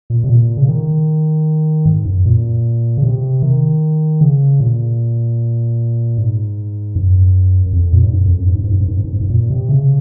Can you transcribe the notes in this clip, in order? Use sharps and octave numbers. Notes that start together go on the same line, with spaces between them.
A#2
C3
A#2
C#3
D#3
G#2
F#2
A#2
C#3
C3
D#3
C#3
A#2
G#2
F#2
F#2
F2
A#2
G#2
F#2
F2
F#2
G#2
F#2
G#2
F#2
G#2
F#2
G#2
F#2
G#2
F#2
A#2
C3
C#3